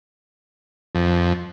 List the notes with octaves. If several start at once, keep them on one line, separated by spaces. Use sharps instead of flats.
F2